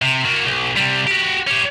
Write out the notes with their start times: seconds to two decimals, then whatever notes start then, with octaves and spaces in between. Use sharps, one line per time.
0.02 C3
0.25 A#3 F#4
0.46 B1
0.77 C3 G3
1.07 F#4 G4
1.47 C#4 G4